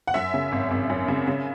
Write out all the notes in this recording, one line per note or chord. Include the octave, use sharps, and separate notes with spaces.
F#5
F#2 E5
C#3
G#1
G#1
F#2
C#3
C#3